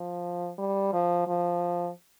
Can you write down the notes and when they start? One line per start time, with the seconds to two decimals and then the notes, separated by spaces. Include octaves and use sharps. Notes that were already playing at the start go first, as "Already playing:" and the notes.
Already playing: F3
0.58 G3
0.93 F3
1.28 F3